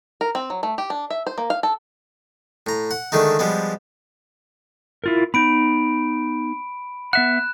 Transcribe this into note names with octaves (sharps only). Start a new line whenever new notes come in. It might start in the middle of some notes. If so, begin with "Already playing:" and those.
A#4
C4
F#3
A3
G4
D4
E5
C5
A#3
F5
A4
A2 A#5
F#5
D3 D#3 G#3 A3 D#4
F3 G3 G#3 B3
E4 F4 A#4
B3 D#4 B5 D7
B3 E5 F#5 F#6 E7